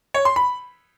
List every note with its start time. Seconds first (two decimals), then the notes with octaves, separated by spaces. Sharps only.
0.14 C#5
0.25 C6
0.36 B5